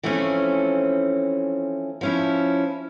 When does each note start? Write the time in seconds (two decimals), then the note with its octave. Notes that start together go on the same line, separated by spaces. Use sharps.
0.03 E3 F3 A3 C4 C#4
2.01 F3 C#4 E4